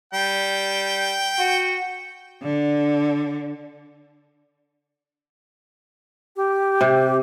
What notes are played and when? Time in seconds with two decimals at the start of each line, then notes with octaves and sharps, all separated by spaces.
0.13 G3 G5
1.39 F#4
2.42 D3
6.36 G4
6.81 C3